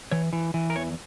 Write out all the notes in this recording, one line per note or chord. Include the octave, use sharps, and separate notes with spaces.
E3 C#5
E3
E3
A#4
E2 C#5